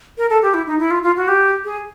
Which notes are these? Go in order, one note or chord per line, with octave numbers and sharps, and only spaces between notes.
A#4
A4
G4
E4
D#4
E4
F4
F4
F#4
G4
G#4